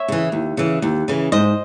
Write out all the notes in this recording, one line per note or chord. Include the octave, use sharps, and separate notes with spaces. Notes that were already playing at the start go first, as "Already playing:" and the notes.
Already playing: C#5 E5
C#3 E3
D#2
C#3 E3
D#2
C#3 E3
G#2 C5 D#5